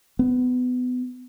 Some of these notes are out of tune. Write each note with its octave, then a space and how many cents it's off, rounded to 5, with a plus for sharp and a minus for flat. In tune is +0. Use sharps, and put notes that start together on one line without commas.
B3 +25